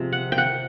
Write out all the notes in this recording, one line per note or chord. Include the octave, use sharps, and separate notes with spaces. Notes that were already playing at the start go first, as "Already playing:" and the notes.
Already playing: C3 F3 G#3
F#5
G5
F#5